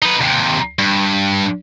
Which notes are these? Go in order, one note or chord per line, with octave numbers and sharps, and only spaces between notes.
D#4 B4
D#2 C3
G2